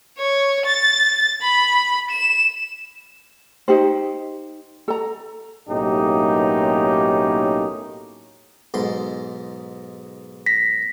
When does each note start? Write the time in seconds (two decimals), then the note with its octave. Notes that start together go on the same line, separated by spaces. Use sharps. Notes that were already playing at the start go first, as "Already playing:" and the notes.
0.18 C#5
0.65 A6
1.42 B5
2.11 E7
3.68 D#4 G4 C5
4.88 A4 A#5
5.69 B1 A2 A#3 C#4 D#4 G4
8.74 B1 G#2 C6
10.46 A#6 B6